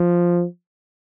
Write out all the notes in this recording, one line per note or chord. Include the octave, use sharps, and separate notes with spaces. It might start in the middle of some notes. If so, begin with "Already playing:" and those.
Already playing: F3